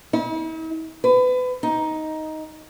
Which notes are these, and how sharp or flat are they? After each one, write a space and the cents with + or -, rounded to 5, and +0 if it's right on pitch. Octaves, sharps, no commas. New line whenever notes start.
E4 -45
B4 +30
D#4 +10